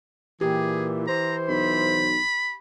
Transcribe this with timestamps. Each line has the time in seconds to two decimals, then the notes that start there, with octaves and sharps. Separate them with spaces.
0.41 A#2 E3 G4 G#4
1.07 E3 C5 A#5
1.49 B1 B5